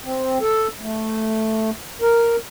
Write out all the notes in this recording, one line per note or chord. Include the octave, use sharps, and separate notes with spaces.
C4
A4
A3
A#4